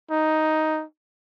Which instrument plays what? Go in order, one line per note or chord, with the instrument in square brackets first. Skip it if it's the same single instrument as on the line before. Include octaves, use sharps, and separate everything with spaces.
[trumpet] D#4